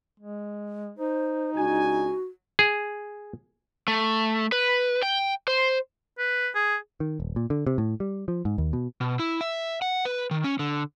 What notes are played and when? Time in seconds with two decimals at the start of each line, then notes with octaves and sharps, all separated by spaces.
0.20 G#3
0.98 D#4 C5
1.56 C#2 D4 F#4 G#5
2.59 G#4
3.88 A3
4.52 B4
5.03 G5
5.48 C5
6.18 B4
6.55 G#4
7.00 D#3
7.20 D#1
7.36 A#2
7.50 D3
7.67 C3
7.78 A2
8.00 G3
8.28 F3
8.45 G#2
8.58 D#2
8.73 B2
9.01 B2
9.19 E4
9.41 E5
9.82 F#5
10.05 B4
10.31 D#3
10.44 C#4
10.59 D3